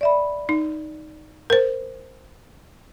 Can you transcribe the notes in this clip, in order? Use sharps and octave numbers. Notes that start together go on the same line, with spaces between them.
D5 E5 B5
D#4
A#4 C5